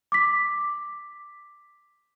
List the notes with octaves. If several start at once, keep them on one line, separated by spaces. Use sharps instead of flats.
D6 B6